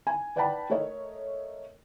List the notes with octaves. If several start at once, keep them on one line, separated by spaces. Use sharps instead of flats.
G#5
B4 D5 F#5 G5 A5 B5
A3 A4 A#4 C#5 D#5